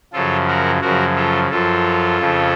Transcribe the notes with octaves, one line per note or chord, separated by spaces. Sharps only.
F#2 C#3 F3 F4 A4
F#4 A#4
F#2 C#3 F3 F#4 A#4
F4 A4
F#2 F3 F4 A4
F2 C#3 F3